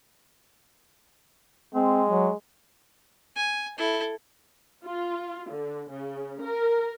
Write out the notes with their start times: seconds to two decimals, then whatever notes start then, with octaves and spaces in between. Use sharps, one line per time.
1.75 G#3 C4
2.09 F#3
3.36 G#5
3.78 E4 A4
4.85 F4
5.50 D3
5.90 C#3
6.42 A#4